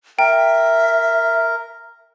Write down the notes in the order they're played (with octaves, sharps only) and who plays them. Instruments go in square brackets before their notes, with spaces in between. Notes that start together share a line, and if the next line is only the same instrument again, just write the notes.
[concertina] A#4 [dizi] E5 [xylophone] G5